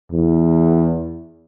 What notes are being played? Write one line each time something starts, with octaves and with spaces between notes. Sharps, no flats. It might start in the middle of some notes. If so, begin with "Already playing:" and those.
E2